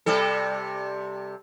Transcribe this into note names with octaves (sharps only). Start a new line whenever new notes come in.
C3 G3 A4